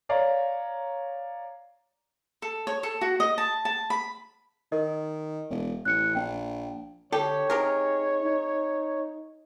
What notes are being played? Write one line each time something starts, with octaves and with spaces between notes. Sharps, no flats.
C#5 D5 F5 A#5
A4
C#5
A4
F#4
D#5
A5
A5
B5
D#3 A#4 D#5
E1
A1 F#6 C#7
A#1 G5
D3 G4 A4 C#5
C3 D#4 G4 G#4 A#4
D#4